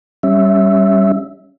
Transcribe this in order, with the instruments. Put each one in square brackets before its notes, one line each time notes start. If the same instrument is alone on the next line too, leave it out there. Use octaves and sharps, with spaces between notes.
[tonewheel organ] G3 C#4 E5